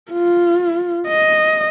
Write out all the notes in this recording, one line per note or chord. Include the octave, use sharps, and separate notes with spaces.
F4
D#5